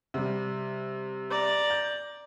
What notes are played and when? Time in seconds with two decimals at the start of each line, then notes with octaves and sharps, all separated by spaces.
0.14 C3 G3
1.31 D5 A#5
1.70 G6